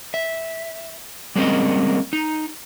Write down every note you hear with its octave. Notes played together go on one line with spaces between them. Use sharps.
E5
G3 G#3 A#3 C4 C#4 D#5
D#4